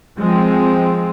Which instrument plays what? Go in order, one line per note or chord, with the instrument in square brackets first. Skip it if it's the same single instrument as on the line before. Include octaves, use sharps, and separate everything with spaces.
[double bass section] F3 G#3 C4